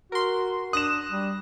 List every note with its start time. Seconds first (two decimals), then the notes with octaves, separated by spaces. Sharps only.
0.12 F#4 A#4 C6
0.73 D4 D#6 F#6 A#6 E7
1.10 G3